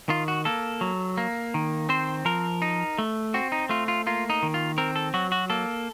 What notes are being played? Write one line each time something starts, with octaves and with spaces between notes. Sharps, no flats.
D#3 F4
F#4
A#3 A4
F#3
A#3
D#3
C4 C5
F3 A#4
D#4
A3
C4 F#4
D#4
A3 F4
F4
A#3 F4
D#4
D#3
F4
C4 A#4
A4
F#3 F#4
F#4
A#3 A4